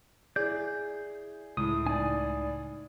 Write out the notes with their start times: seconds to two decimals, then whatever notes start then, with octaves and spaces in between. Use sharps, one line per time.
0.36 E4 G#4 D5 G6
1.57 C#2 A2 D#6
1.87 D#4 D5 G#5